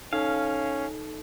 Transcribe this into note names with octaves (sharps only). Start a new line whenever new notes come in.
C#4 D#4 A4 F5